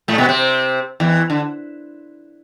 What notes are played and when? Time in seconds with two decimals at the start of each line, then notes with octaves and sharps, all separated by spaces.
0.08 A2 A3
0.18 B2 B3
0.29 C3 C4
1.00 E2 E3
1.30 D3